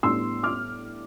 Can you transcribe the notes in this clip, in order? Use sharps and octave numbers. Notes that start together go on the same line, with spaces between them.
A2 G3 B3 D4 C6 E6
D6 F6